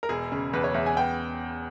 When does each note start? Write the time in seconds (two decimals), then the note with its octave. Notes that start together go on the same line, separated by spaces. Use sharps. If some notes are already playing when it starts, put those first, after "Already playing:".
0.03 A#4
0.09 E1 G#4
0.32 C#3
0.53 E2 B4
0.64 C#5
0.74 E2 E5
0.86 G#5
0.97 B3 G5